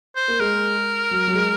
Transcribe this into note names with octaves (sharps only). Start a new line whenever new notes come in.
C5
A#3
G#3 A#4
F#3
F#3
G#3